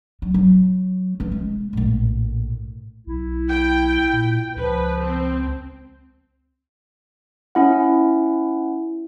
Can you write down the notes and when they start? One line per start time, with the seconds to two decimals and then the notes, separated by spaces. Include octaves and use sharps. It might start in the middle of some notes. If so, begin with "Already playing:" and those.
0.22 F#3
0.34 F#3
1.20 E3 C#4
1.32 G#3
1.73 A#1 A2
3.07 B1 E4
3.50 G5
4.13 A#2
4.56 C#2 F3 B4
5.01 C4
7.55 C#4 E4 F#5